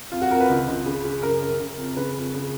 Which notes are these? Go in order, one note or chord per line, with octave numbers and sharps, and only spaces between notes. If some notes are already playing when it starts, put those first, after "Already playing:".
F2 F4
F#4
F2 A#4
B4
C#2
C#2
C#3
C#3
F#2 A#4
F#2
C#3
F2
C#3 B4
F2
C#3